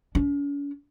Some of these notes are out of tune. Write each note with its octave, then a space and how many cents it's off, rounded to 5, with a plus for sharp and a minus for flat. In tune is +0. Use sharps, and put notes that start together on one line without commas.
C#4 +45